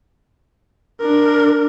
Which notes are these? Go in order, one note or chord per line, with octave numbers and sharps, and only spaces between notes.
D4 A#4